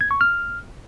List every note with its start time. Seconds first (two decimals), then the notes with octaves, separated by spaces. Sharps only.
0.01 G#6
0.11 C#6
0.21 F6